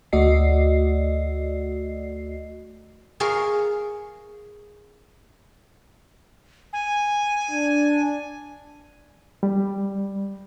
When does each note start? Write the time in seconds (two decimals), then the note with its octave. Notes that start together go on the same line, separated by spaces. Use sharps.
0.13 D2 A3 F#4 D5 D#5 C7
3.20 G#4 A#4 C#5 F5
6.73 G#5
7.51 D4
9.43 G3